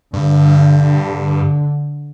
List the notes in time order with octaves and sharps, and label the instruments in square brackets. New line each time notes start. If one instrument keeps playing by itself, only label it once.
[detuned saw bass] G2 [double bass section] D3